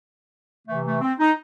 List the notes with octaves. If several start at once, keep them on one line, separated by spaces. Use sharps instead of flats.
C3 E3 A3
A3
C4
D#4